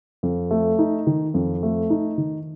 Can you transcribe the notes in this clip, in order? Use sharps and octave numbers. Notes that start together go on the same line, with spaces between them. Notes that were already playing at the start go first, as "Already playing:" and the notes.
F2
A3
D#4
D#3
F2
A3
D#4
D#3